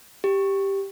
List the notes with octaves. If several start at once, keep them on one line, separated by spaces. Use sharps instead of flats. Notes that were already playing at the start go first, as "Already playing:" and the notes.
G4